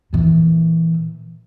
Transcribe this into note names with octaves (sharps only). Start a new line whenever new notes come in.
A#2 E3